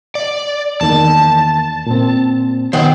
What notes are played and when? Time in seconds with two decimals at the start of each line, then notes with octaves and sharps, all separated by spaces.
0.15 D5
0.81 E2 D#3 A#3 A5
1.87 A#2 C4
2.73 D#3 B3 C5 F#5 G5